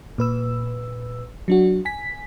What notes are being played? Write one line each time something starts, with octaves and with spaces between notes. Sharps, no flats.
A#2 B4 E6
F#3 D4 F#4
G#5 B6